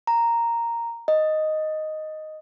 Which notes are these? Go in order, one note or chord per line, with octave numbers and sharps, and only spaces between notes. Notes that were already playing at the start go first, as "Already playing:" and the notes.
A#5
D#5